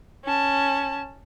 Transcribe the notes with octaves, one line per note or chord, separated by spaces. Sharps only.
C#4 A5